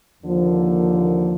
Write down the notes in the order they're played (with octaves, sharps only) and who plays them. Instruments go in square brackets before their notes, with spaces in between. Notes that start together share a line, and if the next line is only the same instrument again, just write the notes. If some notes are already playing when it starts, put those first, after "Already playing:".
[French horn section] D#2 D3 F3 A#3